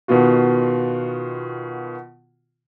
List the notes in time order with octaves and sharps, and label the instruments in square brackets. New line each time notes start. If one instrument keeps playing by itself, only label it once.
[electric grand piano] B2 D#3 B3 F4 F#4